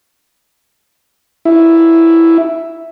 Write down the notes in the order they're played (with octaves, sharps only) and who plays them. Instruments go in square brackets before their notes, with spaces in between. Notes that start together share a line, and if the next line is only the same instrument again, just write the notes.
[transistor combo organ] E4